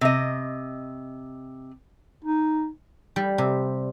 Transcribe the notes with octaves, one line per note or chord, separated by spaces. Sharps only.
C3 D#5
D#4
G3
C3